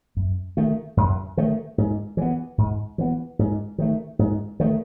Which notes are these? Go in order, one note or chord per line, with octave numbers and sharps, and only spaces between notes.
F#2
D#3 A3
F#2
D#3 A3
G#2
E3 B3
G#2
E3 B3
G#2
D#3 A3
G#2
D#3 A3